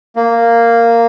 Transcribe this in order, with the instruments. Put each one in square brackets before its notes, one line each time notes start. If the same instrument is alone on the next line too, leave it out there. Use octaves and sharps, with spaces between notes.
[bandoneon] A#3